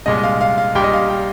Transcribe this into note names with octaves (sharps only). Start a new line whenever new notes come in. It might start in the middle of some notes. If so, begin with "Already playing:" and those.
C2 A#2 G#3 D#5
D#5
F5
F5
F5
A#1 A#2 G3 G5
D#5
F5
G5